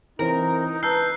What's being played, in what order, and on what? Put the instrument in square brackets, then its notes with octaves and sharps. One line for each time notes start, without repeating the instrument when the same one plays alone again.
[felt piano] E3 C4 [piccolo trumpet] D#4 [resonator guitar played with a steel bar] A#4
[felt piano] B4 A5 A#5 [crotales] E6 F#6 C7 [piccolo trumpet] G6